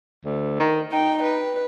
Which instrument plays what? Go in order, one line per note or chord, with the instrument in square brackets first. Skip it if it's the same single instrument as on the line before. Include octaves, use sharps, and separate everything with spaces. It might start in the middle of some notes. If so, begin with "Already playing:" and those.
[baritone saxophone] D2
D#3
[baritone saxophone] D#4 [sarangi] G5
[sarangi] B4